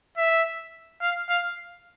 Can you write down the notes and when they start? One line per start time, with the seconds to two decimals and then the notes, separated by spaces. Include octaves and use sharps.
0.17 E5
1.02 F5
1.29 F5